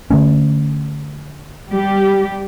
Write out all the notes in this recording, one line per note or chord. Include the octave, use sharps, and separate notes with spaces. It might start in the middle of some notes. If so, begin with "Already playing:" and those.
D3 A3 C#4
G3 G4